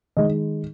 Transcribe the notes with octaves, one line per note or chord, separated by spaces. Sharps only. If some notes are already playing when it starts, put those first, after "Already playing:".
D#3 G#3 D#5